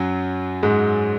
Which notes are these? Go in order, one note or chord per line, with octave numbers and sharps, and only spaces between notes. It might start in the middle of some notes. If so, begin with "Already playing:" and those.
Already playing: F#2 F#3
G#2 G#3